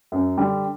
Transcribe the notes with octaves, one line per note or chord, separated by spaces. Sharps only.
F#2
D3 G3